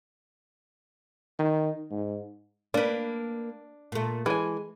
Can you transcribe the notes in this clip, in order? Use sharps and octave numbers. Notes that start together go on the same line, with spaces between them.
D#3
G#2
A#3 D4 B4
A#2 A3
E3 G#3 G#5